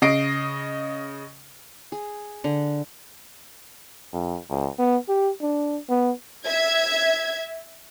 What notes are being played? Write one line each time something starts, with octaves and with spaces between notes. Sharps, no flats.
C#3 D#5 C7 D7
G#4
D3
F2
C#2
B3
G4
D4
B3
E5 G#6